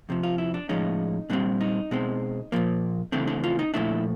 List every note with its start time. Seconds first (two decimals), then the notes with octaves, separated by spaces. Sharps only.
0.09 F2 C3 F3
0.23 F4
0.38 E4
0.54 D4
0.69 A2 F3 G#3 C#4 D#4
1.29 A#2 G3 C4 D4
1.61 D#4
1.91 B2 G#3 C4
2.52 A#2 F3 A#3
3.12 C#3 E3 A3 C4 D4
3.28 D4
3.44 F4
3.59 D#4
3.74 A#2 F3 A3 D4 E4